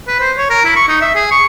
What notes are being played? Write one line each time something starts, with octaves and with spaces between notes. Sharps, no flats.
B4
C5
C#5
A#4
E4
C#6
D#4
E5
G#4
C#6